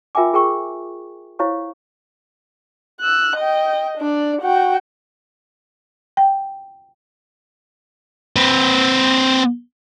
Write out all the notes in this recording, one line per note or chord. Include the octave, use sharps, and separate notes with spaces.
F4 A#4 E5 G5 G#5 D6
F4 G#4 A#4 G5 C#6
E4 C5 C#5 F5 C#6
E6 F#6
D#5 G5
D4 D5
F#4 G5
G5
C4 B4